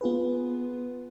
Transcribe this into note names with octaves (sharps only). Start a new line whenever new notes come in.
B3 F4 G#4 B4